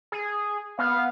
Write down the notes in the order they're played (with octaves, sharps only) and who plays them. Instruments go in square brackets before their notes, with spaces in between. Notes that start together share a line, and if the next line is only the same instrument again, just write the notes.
[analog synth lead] G#4
[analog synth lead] B3 [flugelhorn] F5